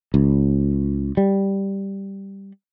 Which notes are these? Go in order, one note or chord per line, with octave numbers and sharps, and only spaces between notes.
C#2
G3